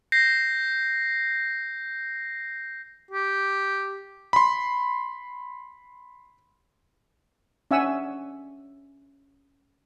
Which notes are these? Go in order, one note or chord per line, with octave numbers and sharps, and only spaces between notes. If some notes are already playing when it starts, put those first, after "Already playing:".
G6 A#6 C7
G4
B5 C6
C#4 D4 E5 F#5 G#5 E6